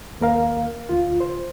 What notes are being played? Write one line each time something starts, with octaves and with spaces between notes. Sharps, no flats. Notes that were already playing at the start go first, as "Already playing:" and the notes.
D#2 A#3 A#4 F5
D2 F4
C5